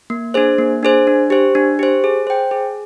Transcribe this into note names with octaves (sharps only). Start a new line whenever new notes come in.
A#3
D4 G#4 C5
A#3
D4 G#4 C5
D4
G4 C5
D4
G4 C5
G#4
C5 G5
G#4